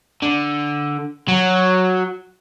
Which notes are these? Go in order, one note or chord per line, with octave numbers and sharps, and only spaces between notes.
D3
F#3